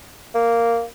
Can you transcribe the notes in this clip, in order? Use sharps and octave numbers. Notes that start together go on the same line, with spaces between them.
A#3